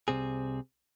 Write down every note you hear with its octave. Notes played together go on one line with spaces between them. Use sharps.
C2 C3 C4 G#4